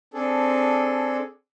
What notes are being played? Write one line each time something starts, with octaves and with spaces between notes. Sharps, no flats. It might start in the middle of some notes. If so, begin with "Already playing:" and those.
C4 D4 G#4 A4